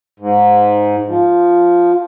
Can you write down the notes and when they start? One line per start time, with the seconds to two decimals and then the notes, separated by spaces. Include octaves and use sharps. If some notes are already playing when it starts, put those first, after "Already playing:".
0.20 G#2
1.07 F3